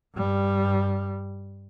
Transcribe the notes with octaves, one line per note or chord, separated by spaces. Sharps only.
G2 G3